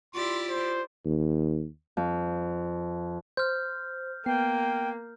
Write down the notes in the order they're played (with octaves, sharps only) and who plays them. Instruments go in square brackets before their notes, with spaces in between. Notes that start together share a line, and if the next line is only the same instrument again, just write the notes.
[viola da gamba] E4 G4 D5 [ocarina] F4 [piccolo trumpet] C6
[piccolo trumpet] C5
[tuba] D#2
[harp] F2
[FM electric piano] C5 [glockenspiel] F6 G6
[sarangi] A#3 [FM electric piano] B3 C7 [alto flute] G5